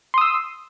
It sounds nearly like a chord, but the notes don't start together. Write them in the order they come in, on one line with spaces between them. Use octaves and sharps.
C6 D#6 E6